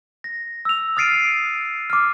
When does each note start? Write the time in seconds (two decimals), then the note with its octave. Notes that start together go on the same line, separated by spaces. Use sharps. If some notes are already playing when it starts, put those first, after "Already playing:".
0.24 A#6
0.65 E6 F7
0.97 D#6 F6 A6 C7 D7 D#7
1.90 D6 F6